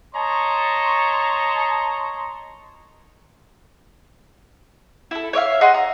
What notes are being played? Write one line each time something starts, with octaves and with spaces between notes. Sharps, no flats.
C#5 D#5 A5 A#5 C6 C#6
E4 A4
C#5 D5 E5 F5
G#4 D#5 F#5 C6
A#5